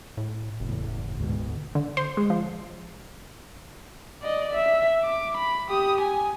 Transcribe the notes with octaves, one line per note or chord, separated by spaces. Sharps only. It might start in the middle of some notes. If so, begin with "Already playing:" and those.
A2
F#1 E2 A2
D2 G#2 B2
D3
C5
G#3
F3
D5 D#5
E5
D6
B5
G4 D#6
G#5